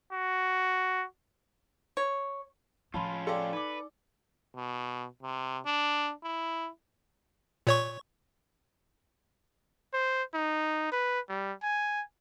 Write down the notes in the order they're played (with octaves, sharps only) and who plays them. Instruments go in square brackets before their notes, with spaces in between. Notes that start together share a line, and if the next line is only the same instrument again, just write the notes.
[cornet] F#4
[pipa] C#5
[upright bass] A2 F3 [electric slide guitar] C#4 F4 [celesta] A5 B5 C6
[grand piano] A4 D5 [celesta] F5 G5 C6
[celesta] D#4 D6 [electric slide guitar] B4
[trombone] B2
C3
D4
E4
[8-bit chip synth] A#2 C#5 C#6
[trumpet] C5
D#4
B4
G3
G#5